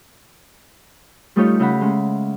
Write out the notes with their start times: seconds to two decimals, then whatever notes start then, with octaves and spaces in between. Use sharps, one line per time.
1.36 G3 A3 D#4 F4 G4 C#5
1.59 C#3 G4 E5 F#5 B5
1.81 G#3 C#4